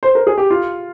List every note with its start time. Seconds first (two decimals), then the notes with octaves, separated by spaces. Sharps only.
0.03 C5
0.15 A#4
0.27 G#4
0.38 G4
0.50 F4